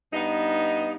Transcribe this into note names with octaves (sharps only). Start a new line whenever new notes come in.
G2 B3 D#4